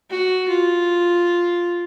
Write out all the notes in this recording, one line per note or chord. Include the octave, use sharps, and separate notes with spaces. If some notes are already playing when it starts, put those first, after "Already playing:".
F#4
F4